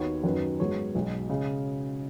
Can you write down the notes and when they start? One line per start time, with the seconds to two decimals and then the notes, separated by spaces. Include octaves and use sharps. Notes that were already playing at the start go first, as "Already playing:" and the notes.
Already playing: D#2 D#3 B3 F#4 C#5
0.24 F#2 D#3 F#3 C#4 B4
0.59 G#2 F#3 B3 G#4 C#5
0.95 B1 B2 G#3
1.30 C#3 G#3